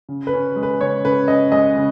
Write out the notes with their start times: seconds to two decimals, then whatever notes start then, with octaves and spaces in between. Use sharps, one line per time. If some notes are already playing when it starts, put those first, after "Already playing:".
0.09 C#3
0.27 B4
0.33 C#4
0.56 G#3
0.63 B4
0.81 C#3 C#5
1.05 C#3 B4
1.28 C#4 D#5
1.52 G#3 D#5
1.76 C#3